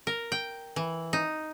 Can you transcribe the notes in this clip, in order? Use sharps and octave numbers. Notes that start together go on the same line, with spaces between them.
A#4
G5
E3
D#4